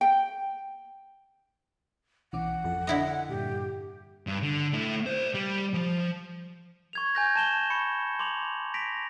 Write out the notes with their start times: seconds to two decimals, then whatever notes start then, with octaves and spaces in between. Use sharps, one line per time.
0.01 G5
2.33 B1 E3 C#4 F#5 D6
2.64 G#1 F2 A4
2.87 D3 E4 D#5
3.29 G2 A#2 G4
4.27 G2
4.43 D3
4.73 A3 E4
5.06 C5 D5
5.34 G3
5.74 F3
6.93 C#6 G#6 F7
7.15 G#5 G6 A#6
7.36 A5 E7 G7
7.70 B5 C#6 C#7
8.19 C6 D6 F7 F#7
8.74 A#6 B6 D7 F7